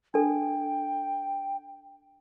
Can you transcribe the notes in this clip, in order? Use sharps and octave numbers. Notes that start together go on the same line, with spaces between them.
D4 A4 G5